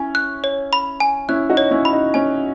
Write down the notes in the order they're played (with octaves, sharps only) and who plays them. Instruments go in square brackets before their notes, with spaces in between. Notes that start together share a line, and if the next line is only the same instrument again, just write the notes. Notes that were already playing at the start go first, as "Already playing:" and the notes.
Already playing: [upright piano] C#4 E4 [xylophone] G#5
[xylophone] F#6
C#5
B5
G#5
[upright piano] C#4 E4 [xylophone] F#6
[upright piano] D#4 F#4
[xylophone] C#5
[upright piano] C#4 E4
[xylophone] B5
[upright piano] D#4
[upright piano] C#4 [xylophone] G#5